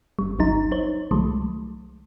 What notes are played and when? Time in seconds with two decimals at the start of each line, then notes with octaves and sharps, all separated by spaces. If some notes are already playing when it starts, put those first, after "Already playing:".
0.19 G1 G3
0.39 G1 C#2 F#3 D#4 A#5
0.71 D#4 C5 C#5
1.11 C2 D#3 F3 F#3 G#3 A3